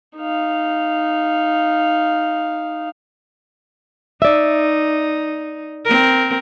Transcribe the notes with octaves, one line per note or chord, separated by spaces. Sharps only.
D#4 F5
D#4 D5 E5
C4 A#4